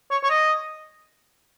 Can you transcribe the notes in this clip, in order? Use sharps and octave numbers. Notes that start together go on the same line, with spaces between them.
C#5
C#5
D#5